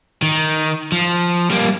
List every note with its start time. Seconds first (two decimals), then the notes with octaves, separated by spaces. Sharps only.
0.22 D#3
0.92 F3
1.50 G3 A#3